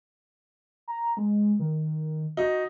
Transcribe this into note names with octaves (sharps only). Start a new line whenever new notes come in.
A#5
G#3
D#3
D#4 F#4